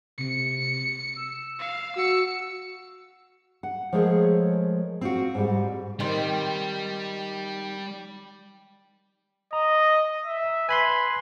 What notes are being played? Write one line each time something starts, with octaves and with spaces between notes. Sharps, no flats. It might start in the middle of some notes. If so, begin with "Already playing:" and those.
C3 C#7
E6
F5
F#4 E6 C#7
F#5
F3 G#3 A3 G#4 A#4 C#5
C4 F4 F#4
G#2 G3
D#3 G3 C4
D#5 A#5
E5
B4 G#5 B5 C6